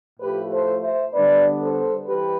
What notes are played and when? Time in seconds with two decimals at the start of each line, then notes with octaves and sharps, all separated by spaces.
0.20 A2 F3 A3 G4 B4
0.51 A4 C5
0.83 C5 E5
1.13 D3 G3 B3 D4 B4 D5
1.61 A4 C5
2.07 E3 G3 G4 B4